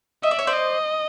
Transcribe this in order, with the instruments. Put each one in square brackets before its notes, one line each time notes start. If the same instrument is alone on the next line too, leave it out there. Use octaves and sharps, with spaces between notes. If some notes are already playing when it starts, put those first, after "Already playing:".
[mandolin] D#5 [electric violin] E5
[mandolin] D5
C#5
C5 D5
[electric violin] D#5